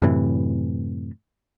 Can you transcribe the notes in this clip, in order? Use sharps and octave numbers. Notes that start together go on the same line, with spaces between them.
F#2 A2 C3 E3